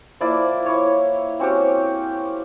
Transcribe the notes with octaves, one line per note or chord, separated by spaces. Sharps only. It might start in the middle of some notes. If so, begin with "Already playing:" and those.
F3 A#3 E4 D5
E4 C#5
C4 C#4 F#4 G4